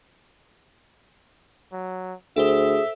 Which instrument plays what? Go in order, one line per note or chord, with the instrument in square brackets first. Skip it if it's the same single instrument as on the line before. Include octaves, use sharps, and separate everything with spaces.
[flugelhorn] F#3
[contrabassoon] D2 [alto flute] G#4 [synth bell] A4 C5 [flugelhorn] E5